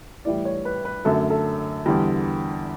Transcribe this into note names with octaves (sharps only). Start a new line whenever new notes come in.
A2 E3 G3 D5
C#5
B4
B4
F#2 D3 A3 A4
A4
E2 D3 G3